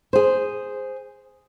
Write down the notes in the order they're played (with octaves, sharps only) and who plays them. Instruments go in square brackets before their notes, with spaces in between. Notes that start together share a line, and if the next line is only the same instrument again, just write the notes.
[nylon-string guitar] G#4 C5